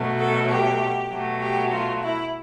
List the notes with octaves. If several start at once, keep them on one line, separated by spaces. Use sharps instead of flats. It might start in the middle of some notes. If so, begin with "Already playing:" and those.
Already playing: B2 F#3 A3
A4
G4
B2 F#3 A3
G4
F4
E4